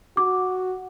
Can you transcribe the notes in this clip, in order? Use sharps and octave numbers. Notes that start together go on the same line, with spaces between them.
F#4 D6